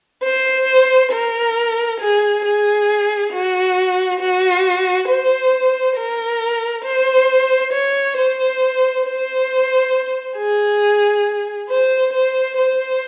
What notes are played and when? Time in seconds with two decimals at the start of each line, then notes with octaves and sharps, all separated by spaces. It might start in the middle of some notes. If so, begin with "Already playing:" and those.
0.23 C5
1.12 A#4
2.00 G#4
2.44 G#4
3.32 F#4
4.20 F#4
5.08 C5
5.96 A#4
6.84 C5
7.73 C#5
8.17 C5
9.05 C5
10.37 G#4
11.69 C5
12.13 C5
12.58 C5